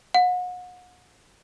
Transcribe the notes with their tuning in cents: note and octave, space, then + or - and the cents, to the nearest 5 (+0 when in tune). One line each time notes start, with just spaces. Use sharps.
F#5 -35